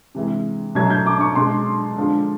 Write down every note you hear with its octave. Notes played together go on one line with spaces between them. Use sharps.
C3 E3 G#3
B2 F#3 A3 G#6
G6
D6
C#6
B2 G#3 C6
D3 F3 G#3